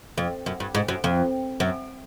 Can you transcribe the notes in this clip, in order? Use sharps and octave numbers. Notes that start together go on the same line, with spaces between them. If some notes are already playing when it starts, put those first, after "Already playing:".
F2
F#2
G2
G#2
F#2
F2
F#2